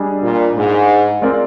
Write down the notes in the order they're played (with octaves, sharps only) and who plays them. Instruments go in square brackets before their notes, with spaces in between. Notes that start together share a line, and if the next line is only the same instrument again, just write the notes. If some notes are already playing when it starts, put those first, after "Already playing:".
Already playing: [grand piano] G3 D4 G#4 D#5
[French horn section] A#2
G#2
[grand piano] G#3 C4 F4 A#4 D5